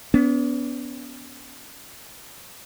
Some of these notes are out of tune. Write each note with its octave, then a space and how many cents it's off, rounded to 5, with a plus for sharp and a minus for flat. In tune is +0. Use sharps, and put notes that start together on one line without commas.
B3 +0 D4 -45